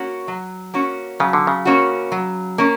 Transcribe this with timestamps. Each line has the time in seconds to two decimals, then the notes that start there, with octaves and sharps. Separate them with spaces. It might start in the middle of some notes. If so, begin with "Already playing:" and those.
Already playing: A#3 C#4 F#4
0.28 F#3
0.74 A#3 C#4 F#4
1.20 C#3 F#3
1.33 D3
1.47 C#3
1.65 A#3 C#4 F#4
2.12 F#3
2.58 A#3 C#4